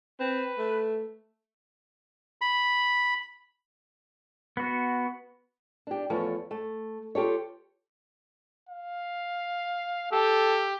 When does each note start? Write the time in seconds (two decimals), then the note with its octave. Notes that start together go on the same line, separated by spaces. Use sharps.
0.20 C4 B4
0.58 A3
2.41 B5
4.57 B3 F#4
5.87 D4 G4
6.10 E2 F3 A3 C#5
6.51 A3
7.15 F4 G4 A4 C#5
8.69 F5
10.12 G4 A4